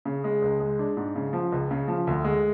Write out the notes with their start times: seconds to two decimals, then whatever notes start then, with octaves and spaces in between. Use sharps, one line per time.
0.05 C#3
0.24 G#3
0.42 C#2
0.60 G#3
0.79 D4
0.97 G#2
1.15 C#3
1.33 F3
1.52 C#2
1.71 C#3
1.88 F3
2.07 D2
2.24 G#3